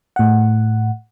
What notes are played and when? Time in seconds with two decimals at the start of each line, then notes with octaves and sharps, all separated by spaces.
0.16 A2 F#5